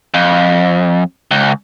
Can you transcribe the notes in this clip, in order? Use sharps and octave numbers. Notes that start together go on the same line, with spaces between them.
F2
C#2